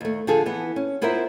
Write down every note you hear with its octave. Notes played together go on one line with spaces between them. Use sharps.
D#2 A3
D3 F3 G#4 A4
E3 B3
C#4
B3 E4 F4 A#4 C5 E5